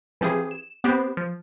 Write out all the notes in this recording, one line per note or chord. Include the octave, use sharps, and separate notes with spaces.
E3 F3 C4 G4 G#4
E7
B3 C4 G4 B4 C5
F3